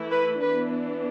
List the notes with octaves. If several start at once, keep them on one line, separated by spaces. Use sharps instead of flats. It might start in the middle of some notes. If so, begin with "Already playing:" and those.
Already playing: E3 A3 E4
B4
E3 B3 D4 B4